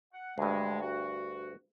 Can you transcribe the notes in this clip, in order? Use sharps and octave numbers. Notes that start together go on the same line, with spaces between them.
F#5
D2 G2 G#3
F#4